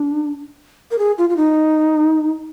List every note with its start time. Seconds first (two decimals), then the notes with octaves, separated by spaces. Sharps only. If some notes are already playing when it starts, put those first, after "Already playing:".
Already playing: D4
0.91 A#4
0.99 G#4
1.18 F4
1.30 F4
1.37 D#4